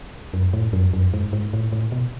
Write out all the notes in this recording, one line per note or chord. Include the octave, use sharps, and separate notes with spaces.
F#2
A2
F#2
F#2
G#2
G#2
A2
A2
B2